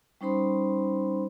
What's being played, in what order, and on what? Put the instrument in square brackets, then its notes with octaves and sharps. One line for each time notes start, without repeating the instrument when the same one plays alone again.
[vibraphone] G3 C#4 D#4 C5 B5 C6